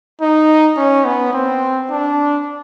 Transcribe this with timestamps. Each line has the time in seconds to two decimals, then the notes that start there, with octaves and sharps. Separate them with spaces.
0.21 D#4
0.77 C#4
1.05 B3
1.33 C4
1.90 D4